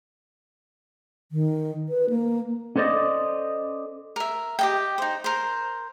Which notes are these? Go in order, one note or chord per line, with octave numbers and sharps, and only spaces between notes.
D#3
B4
A#3
C#4 A4 C5 D5 D#5
A#4 E5
G4 D#5 G5
D#4 C5
A#4 C5